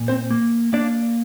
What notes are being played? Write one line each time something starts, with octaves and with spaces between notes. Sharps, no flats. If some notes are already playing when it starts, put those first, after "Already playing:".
Already playing: A#2
C4 C5
A#3
A#3 D4 D5